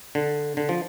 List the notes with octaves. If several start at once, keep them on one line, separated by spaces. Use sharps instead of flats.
D3
D3
F3